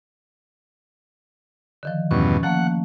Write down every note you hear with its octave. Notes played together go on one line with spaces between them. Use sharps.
D3 D#3 F3
E2 G2 B2 C#4
F3 A3 A#3 F#5